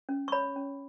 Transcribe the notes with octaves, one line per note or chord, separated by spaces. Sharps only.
C#4
C#6
C#5 B5
C#4